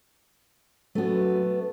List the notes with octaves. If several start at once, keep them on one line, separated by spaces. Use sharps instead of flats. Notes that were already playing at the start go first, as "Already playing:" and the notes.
F#3 A3 B3 C#4 F#4